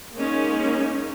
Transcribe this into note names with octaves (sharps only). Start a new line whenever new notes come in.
G#3 A#3 C#4 D#4